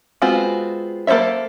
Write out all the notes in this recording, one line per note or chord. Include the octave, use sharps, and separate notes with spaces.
G#3 B3 C4 F4 F#4
A#3 A4 C5 C#5 E5